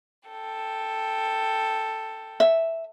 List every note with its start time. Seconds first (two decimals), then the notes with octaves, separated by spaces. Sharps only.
0.30 A4 G5
2.40 E5